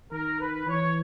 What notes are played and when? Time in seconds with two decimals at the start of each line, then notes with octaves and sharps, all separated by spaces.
0.12 D#3 A#4
0.40 B4
0.67 E3 C#5